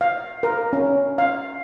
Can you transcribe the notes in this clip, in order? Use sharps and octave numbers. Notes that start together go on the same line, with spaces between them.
F5
A#4
C#4
F5